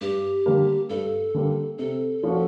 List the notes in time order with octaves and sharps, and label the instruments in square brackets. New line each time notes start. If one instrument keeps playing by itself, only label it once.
[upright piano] G2 [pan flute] G4
[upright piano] D3 G3 A#3
[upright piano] G2 [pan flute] A4
[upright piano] D3 G3 A#3
[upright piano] C3 [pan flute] A4
[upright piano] F3 A#3 C#4 F#4